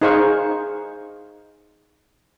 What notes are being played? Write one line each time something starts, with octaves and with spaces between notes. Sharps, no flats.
D#4 G#4 C5 F5 C#6